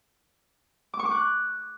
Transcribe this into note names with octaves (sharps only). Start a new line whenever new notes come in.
D6
C#6
D6
F#6